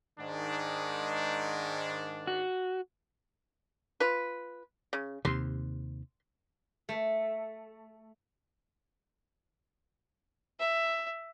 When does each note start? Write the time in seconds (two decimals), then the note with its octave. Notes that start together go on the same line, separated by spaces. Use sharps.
0.18 G#2 D#3 D4
2.27 F#4
4.00 F4 B4
4.93 C#3
5.25 D#2 C3 C6
6.89 A3
10.60 E5